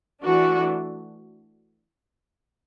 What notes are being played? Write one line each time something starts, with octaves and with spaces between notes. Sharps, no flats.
E3 A3 D4 F#4